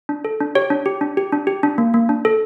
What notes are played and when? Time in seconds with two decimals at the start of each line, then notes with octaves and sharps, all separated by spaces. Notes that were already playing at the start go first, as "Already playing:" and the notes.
0.09 D4
0.25 A4
0.40 D4
0.55 G4 C#5
0.70 D4
0.86 G4
1.01 D4
1.17 G4
1.32 D4
1.47 G4
1.63 D4
1.78 A#3
1.94 A#3
2.09 D4
2.25 A4